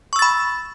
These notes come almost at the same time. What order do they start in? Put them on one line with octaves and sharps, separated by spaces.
C#6 E6 A6 B5